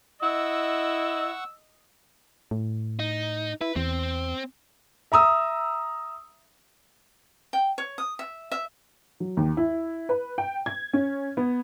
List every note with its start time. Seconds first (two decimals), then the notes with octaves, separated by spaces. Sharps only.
0.22 E4 D#5 F#5 C#6 E6
2.51 A2
2.99 D#4
3.61 E4 B4
3.76 E2 C4
5.12 E5 A#5 D#6 E6
7.53 G5
7.78 C#5
7.98 D#6
8.19 E5
8.52 E5
9.20 F#3
9.37 D#2
9.57 E4
10.09 B4
10.38 G5
10.66 G#6
10.93 C#4
11.37 B3